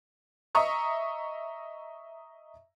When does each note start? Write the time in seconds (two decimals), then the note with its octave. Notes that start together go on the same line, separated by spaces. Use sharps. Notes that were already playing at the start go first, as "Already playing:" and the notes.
0.55 D#5 E5 A#5 C#6 D#6